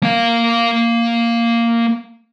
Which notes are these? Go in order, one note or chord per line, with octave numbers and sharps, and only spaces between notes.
A#3 F5